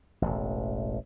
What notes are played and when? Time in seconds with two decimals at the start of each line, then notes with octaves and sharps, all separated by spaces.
0.22 E1 A1